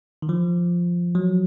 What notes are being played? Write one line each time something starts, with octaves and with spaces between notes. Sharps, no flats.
D#3
F3
F#3